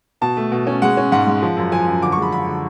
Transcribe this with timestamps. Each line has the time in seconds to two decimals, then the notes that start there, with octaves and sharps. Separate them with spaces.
0.21 B2 A5
0.37 A3
0.52 B2
0.67 C#4
0.82 G#3 F#5
0.97 C#4
1.12 G#2 F#5
1.27 G#3
1.42 F3
1.57 F#2
1.72 F3 G#5
1.87 F#2
2.02 D3 D6
2.12 C#6
2.17 G#3 B5
2.32 D3 B5
2.47 D3